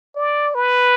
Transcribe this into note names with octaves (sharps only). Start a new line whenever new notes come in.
D5
B4